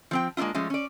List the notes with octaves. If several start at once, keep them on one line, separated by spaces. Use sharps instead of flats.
F3 C4 G5
G#3 A#3 D4 E4 F4
F3 G#3 A3 C#4
C#4 D5